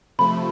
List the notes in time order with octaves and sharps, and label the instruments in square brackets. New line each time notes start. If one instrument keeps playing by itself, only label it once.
[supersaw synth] C3 F3 A3 [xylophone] B5